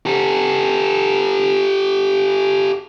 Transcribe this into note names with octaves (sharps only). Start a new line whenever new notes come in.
G4 A4